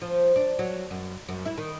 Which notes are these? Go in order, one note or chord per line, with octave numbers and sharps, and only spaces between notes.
F3
D4
F#3
F#2
F#2
E4
D#3